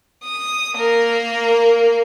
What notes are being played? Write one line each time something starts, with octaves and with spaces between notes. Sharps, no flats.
D#6
A#3 A#4